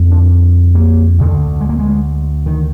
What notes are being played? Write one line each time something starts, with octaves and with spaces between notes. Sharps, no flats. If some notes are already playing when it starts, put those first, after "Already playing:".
Already playing: F2 D3
D4
A#3
D2 D3
G#3
A#3
G#3
D#3